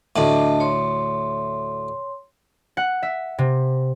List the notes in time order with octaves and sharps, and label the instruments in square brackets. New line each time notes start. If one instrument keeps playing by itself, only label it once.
[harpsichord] D2 A2 [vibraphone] D4 D#5 A5
[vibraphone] C#5 C6
[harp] F#5
E5
C3